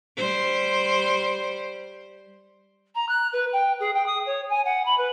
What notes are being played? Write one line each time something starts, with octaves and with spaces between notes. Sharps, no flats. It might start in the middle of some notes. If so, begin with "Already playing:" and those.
G3 C5
A#5
F#6
B4
G5
G#4
G5
D#6
C#5
G#5
F#5
B5
B4